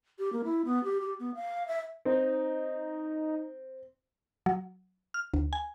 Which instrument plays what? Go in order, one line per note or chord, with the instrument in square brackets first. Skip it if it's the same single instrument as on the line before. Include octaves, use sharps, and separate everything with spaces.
[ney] G4
A#3
E4
B3
G4
G4
B3
F5
E5
[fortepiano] C4 [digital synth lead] D#4
[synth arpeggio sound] F#3
F6
D2
G#5